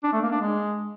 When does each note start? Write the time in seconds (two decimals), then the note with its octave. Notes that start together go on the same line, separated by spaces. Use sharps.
0.03 D4
0.13 A3
0.22 A#3
0.31 D4
0.41 G#3